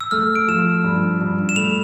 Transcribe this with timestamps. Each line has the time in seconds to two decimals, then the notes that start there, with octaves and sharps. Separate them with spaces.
0.01 E6
0.11 A3 F6
0.35 D7
0.48 F3 E7
0.84 G2
1.21 G2
1.49 E7
1.56 A3 F7